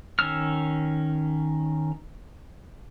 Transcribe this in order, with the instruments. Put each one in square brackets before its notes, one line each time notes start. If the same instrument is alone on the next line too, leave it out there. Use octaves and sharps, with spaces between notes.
[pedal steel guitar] D#3 C#4 E6 F6